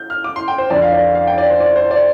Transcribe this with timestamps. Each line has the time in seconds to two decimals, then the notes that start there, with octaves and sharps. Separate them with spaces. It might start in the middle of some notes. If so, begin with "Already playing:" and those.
Already playing: G6
0.10 F6
0.24 D6
0.36 C6
0.48 G5
0.58 C5
0.70 F2 D3 D5
0.82 F5
0.92 D5
1.15 F5
1.27 G5
1.38 D5
1.50 C5
1.60 D5
1.76 C5
1.91 D5